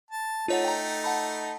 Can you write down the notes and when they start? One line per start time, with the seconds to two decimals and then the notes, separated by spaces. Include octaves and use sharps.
0.11 A5
0.48 A3 D#4 F4 C#5 F#5
0.64 G5 A#5
1.04 F#5 A5 B5